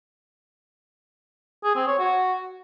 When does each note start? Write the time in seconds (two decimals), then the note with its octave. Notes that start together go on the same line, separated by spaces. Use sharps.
1.64 G#4
1.76 C4
1.87 C#5
1.99 F#4